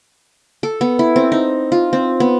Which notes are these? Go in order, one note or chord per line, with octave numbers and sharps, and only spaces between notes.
A4
B3
E4
C4
D#4
F4
C4
B3